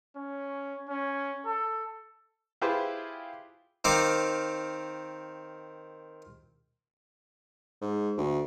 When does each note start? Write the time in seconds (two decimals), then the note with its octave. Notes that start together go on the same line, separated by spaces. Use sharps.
0.16 C#4
0.88 C#4
1.45 A4
2.62 E4 F4 G4 G#4 B4 C5
3.85 D#3 C4 F5 D6
7.81 G#2
8.17 D2